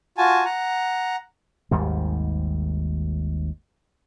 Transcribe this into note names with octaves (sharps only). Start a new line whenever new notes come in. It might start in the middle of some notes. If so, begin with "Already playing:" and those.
F4 F#4 G#5 A5
F#5 A#5
G#1 D#2 G#2 G3